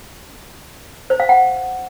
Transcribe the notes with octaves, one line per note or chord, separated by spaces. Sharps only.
C5
F5
F#5